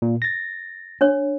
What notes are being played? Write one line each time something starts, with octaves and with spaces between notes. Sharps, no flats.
A#2
A6 A#6
D4 C#5